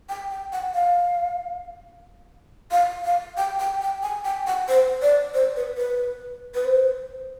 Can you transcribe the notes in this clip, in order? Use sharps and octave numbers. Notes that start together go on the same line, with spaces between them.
G5
G5
F#5
F5
F5
F5
G5
G5
G5
G#5
G5
F#5
C5
D5
C5
B4
B4
B4
C5